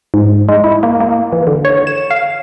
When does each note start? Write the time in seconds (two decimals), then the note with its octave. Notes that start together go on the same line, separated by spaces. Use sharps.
0.14 G#2
0.49 G#3
0.64 E4
0.83 A#3
1.00 A#3
1.33 E3
1.47 D3
1.65 C#5
1.87 E7
2.11 F5